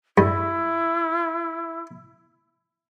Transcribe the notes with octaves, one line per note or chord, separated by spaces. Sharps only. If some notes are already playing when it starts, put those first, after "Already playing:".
G2 E4